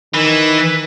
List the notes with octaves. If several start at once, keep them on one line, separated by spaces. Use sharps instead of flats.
D#3 E3